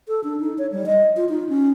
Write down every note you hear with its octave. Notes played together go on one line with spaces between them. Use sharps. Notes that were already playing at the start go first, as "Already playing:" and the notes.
A4
D4
D#4
C#5
G3
D#5
F4
D#4
C#4